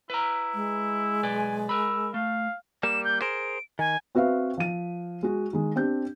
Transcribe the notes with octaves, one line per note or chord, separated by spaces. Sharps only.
E4 B4 A#5
G#3
B1 B4 D5 G#5
A#4 B5 E6
A3 F5
G3 A#3 E7
G6
G#4 A#4 C5 D7
D#3 G#5
C4 F#4 B4 E5 F5
F3 D#7
G#3 F#4
D#3 G#3
C4 D4 G4 G6